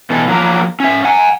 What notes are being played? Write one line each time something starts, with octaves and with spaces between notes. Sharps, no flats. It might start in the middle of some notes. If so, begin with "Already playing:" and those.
B2 E3 A4
F3 F#3 A#3 A#4
C#4 E5
F#5 G#5